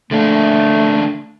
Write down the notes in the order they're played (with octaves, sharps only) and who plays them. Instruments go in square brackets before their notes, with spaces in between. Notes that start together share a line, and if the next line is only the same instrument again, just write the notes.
[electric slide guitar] D3 A#3 D4 [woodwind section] A3